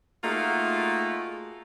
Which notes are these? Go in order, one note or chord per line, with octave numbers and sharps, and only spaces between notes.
A3 A#3 D#4 F4 F#4 G#4